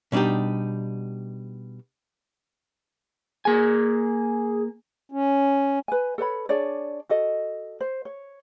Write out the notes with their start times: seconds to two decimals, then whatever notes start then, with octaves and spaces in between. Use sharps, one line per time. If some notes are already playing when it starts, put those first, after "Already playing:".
0.12 B2 G3 D4 D#4 G4
3.45 A#3 G#4 G#5
5.12 C#4
5.88 B4 G#5
6.18 A4 B4 C#5 B5
6.49 D4 G#4 C#5 D5
7.09 F#4 A4 D#5
7.80 C5
8.05 C#5